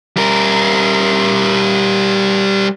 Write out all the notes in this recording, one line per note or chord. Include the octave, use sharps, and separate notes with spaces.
G3 A#4